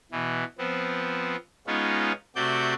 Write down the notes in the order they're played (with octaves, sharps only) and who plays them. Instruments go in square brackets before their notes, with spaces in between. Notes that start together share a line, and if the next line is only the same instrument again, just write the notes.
[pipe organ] B2 E3
F3 B3 C4
G#3 B3 C#4 D#4 F4
C3 A3 C4 F#4 D5 G6